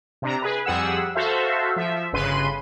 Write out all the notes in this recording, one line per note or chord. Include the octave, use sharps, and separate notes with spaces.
C3 D4 A#5
G#4 B4
F2 G3 G#4 F#5 E6
F#4 A4 C5 E5 F5
F3 E5
G1 C#3 B4 C6 D#7